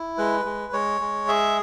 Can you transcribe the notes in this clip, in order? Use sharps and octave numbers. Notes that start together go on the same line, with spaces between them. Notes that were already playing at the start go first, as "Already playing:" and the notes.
Already playing: E4
G#3 B4
G#3
G#3 C#5
G#3
G#4 E5